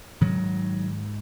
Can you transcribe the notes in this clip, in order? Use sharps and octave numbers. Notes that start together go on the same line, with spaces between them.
G#2 D#3 F#3